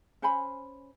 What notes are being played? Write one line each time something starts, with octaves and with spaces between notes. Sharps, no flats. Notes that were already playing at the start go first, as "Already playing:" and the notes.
C#4 C5 G#5 B5